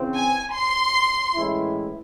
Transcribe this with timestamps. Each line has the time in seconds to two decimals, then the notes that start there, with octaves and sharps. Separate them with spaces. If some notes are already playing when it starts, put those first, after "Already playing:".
Already playing: C#3 E3 C4
0.16 G#5
0.55 C6
1.34 A2 E3 G#3 C#4 E4